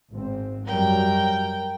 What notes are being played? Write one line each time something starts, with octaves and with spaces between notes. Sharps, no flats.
G#1 G#2 C4
F#2 F#3 G3 A#4 G5